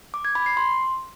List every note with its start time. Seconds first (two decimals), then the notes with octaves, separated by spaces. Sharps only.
0.14 D6
0.25 G#6
0.35 B5
0.46 C7
0.57 C6